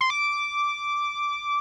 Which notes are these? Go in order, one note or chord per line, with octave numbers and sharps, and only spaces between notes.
C6
D6